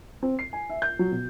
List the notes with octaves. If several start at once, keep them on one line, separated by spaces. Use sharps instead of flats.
C4
C7
G#5
E5
G6
F#3
B2